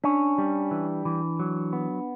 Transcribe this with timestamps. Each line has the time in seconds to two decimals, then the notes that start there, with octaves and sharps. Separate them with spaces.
0.04 C#4 D4
0.38 G3
0.71 E3
1.05 E3
1.40 F#3
1.73 B3